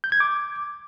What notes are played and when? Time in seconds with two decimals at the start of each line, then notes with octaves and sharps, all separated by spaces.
0.04 G6
0.12 G#6
0.20 D6